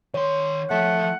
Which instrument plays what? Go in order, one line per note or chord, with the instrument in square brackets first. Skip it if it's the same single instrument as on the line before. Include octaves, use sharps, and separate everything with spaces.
[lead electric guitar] D#3 C6 [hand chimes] C#5
[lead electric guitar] F3 [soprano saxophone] A3 [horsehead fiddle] F#5